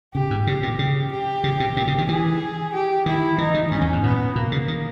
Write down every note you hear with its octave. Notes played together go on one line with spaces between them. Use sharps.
C#3 G4
G#2
C#3 G4
A#2
C#3
G4
C#3
B2
A#2
C#3
D#3
E3 G#4
G4
D#3 E4
E3 D#4
D#3
G2 C#4
E2
G#2
A#2 B3
B2 A#3
C#3
D#3